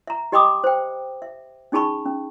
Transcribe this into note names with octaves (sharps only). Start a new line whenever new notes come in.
E5 A#5
G4 D#5 G5 B5 D6 D#6
C5 G5
E5
C#4 D#4 G#4 A5 B5 C#6
C#4